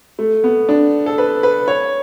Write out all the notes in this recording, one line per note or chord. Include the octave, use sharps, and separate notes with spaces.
A3
B3
D4
A4
B4
B4
C#5